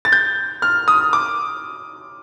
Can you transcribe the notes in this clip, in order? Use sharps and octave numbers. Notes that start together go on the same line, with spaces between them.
A6
G6
F6
D#6
D6